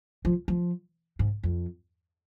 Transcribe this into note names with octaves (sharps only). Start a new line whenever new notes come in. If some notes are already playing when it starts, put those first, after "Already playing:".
F3
F3
G#2
F2